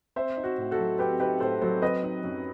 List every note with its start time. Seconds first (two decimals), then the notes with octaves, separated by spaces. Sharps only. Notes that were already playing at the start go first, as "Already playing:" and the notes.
0.16 C4 C5 E5
0.37 D#4
0.44 F#4
0.58 A2
0.71 F#4 A4
0.79 F#3
0.99 C4 G4 B4
1.20 D#4 G4 B4
1.40 A2 A4 C5
1.62 F#3 A4 C5
1.82 C4 B4 D#5
2.03 D#4
2.24 F#2